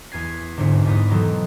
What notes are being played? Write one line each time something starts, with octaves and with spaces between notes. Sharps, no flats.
E2 G#5 G#6 C7
G1 C2 G#2
E2 G#2 B3 D#6
B2 D#3 E3 F#3 G#3 A4